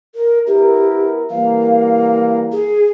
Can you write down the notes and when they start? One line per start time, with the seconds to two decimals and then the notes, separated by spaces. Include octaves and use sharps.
0.15 A#4
0.47 B3 E4 G4 A#4
1.30 E3 G3 A#3 F5
2.52 G#4